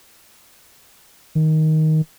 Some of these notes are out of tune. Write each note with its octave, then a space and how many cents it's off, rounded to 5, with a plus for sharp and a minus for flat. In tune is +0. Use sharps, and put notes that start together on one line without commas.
D#3 +10